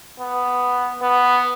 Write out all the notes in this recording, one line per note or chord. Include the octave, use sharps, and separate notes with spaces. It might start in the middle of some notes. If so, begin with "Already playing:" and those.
B3
B3